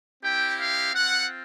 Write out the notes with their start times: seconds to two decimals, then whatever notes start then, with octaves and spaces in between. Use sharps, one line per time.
0.22 C4 E4 G4 G5
0.59 F5
0.94 C4 F4 F#5